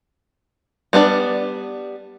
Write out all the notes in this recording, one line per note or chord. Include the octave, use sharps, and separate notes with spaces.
G3 B3 D4 D5